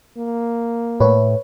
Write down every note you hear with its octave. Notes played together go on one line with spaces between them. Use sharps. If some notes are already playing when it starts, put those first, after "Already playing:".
A#3
A2 A3 B4 C#5